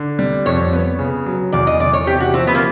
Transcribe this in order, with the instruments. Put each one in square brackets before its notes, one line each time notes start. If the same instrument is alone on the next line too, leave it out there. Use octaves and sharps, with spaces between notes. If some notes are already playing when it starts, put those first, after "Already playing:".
Already playing: [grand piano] D3
G3
[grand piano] F2 [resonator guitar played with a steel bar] C#5
[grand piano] B3
C#3
F#3
[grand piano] E2 [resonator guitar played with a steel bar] D5
[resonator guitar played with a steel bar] D#5
[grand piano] E2 [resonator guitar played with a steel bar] D5
[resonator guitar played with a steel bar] C#5
[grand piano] C3 [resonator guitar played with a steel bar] G4
[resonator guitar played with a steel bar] F#4
[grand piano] F3 [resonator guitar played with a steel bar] C4
[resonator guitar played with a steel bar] B3
A#3